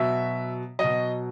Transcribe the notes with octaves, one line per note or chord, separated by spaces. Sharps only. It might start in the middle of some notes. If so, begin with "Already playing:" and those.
Already playing: B2 F#3 E5
B2 F#3 D#5